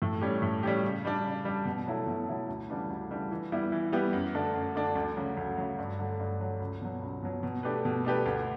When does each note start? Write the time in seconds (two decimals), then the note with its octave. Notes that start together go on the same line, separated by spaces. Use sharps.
0.02 A2
0.21 G3 C#4 G4
0.42 A2
0.63 G3 C#4 G4
0.83 C#3
1.05 G3 D4
1.25 C#3
1.45 G3 D4
1.65 B2
1.87 F#3 A3 E4 A4
2.07 B2
2.27 F#3 A3 E4 A4
2.49 D2
2.69 C#3 E3 G3 D4
2.90 D2
3.11 C#3 E3 G3 D4
3.32 E3
3.52 G3 B3 E4 G4
3.72 E3
3.93 G3 B3 E4 G4
4.13 F#2
4.34 D3 A3 D4
4.55 F#2
4.75 D3 A3 D4
4.95 D2
5.16 C#3 F#3
5.37 D2
5.57 C#3 F#3
5.78 G2
5.99 D3 F#3 A3
6.19 G2
6.40 D3 F#3 A3
6.60 C#2
6.82 B2 F#3
7.02 C#2
7.23 B2 F#3
7.43 B2
7.63 A3 D4 G4 B4
7.85 B2
8.05 A3 D4 G4 B4
8.26 D2